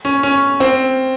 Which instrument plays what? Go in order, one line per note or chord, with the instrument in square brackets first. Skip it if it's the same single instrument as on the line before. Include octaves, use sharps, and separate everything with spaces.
[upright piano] C#4
C#4
C4